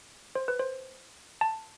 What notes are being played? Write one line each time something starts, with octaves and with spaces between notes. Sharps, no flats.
C5
B4
C5
A5